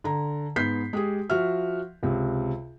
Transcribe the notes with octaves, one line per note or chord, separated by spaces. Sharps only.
D3 A#5
G#2 B3 G6 B6 C7
G#3 G4 G#4
F3 F#4 E5 F6
C#2 C3